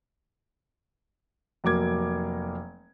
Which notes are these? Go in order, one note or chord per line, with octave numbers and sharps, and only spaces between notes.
F1 F#3 A#3 D6 G#6